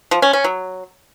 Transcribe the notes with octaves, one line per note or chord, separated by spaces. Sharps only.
F3
C#4
C#4
F#3